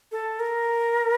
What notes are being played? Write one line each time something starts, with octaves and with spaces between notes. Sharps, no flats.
A4
A#4